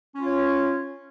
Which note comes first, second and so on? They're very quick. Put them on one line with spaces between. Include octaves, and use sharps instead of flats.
C#4 F4 C#5